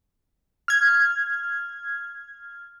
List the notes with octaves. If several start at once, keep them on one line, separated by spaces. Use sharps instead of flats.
F6 G#6